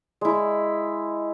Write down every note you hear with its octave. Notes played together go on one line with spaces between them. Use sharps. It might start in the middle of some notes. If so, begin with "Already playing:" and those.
G#3 E4